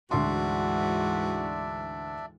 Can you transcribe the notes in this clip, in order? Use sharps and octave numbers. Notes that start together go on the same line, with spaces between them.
D2 G#2 E3 D4 F#4 D5 E5 C6